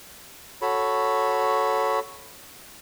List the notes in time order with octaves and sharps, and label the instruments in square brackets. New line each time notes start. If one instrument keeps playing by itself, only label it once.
[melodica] F#4 A4 C#5 B5